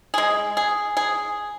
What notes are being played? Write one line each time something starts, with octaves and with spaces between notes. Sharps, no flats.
G#3 G#4
G#4
G#4